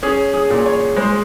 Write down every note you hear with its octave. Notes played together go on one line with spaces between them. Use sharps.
C#4 G#4
G#4
A#2
C#5
G#3 C5